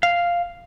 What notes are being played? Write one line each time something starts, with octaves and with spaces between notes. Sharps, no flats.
F5